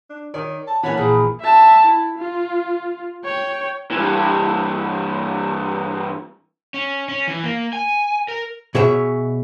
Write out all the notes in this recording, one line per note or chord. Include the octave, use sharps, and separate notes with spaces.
D4
D#3 C#5 D5
A5
E3 A#3 C#5 F#5 G#5 A5 B5
A#1 G#4
E5 A5
E4
F4
C#5 G5
G2 E3
C#4
C#4
E3
A#3
G#5
A#4
B2 G#4 C#5 E5